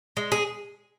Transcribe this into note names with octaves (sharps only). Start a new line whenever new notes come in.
G#3
G#4